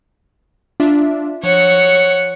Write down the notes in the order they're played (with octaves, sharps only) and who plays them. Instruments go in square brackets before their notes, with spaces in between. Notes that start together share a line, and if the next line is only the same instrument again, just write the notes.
[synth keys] D4 F4 E5
[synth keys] F3 [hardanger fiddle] C#5 F#5